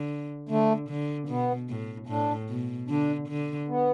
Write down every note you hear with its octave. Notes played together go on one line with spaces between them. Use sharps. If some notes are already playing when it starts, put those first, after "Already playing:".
Already playing: D3
D3 A3
D3
B2 B3
A2
A2 D4
B2
D3 D4
D3
B3